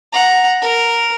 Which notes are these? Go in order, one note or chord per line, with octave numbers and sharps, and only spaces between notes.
F#5 A#5
A#4